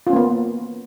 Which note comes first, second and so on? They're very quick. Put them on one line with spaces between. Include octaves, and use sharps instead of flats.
F4 C#4 A#3 B3